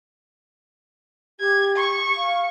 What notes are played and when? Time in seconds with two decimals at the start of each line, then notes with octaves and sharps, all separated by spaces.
1.40 G4 G#6
1.76 C#6
2.17 F5